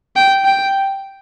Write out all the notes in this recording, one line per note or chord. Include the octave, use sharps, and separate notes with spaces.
G5
G5